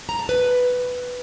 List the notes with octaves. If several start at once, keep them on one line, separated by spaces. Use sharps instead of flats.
A#5
A5
B4